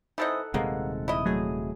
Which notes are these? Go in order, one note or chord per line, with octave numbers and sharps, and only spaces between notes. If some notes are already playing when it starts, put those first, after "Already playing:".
E3 C4 D#4 A4 D#5 F#5
D#1 C3 G#3 A#3 B3
E4 D#5
F#3 A3 G#4